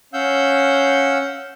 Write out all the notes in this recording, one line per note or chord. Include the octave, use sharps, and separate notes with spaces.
C#4 F5 F#5 E6 G6